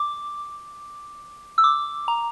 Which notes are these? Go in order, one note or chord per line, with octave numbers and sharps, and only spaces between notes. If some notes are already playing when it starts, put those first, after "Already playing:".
Already playing: D6
E6
D6
A#5